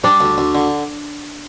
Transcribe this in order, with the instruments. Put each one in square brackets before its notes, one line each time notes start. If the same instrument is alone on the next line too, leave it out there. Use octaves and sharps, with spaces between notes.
[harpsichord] G3 [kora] D4
[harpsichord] D2
D2
D3